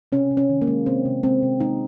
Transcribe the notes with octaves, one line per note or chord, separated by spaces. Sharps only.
C3 C#4
C3
C#4
D#3
A#3
G#3
C3 C4
C3
G#3 C4
C3
G#3 D#4